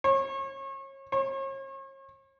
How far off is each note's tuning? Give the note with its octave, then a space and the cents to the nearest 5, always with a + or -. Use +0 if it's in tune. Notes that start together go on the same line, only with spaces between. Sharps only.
C#5 -35
C#5 -40